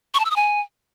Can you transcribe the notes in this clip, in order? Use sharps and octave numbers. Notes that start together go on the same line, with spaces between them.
C#6
A5
E6
D#6
G#5